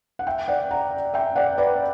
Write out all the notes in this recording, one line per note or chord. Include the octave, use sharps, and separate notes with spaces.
F#5
E5 G5
D5 F#5
F#5 A#5
E5 G5
D5 F#5
B4 D5